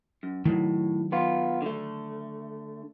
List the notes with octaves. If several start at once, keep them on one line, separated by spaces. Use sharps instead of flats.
F#2
A2 D#3 F#3
B3 F4
D3 A3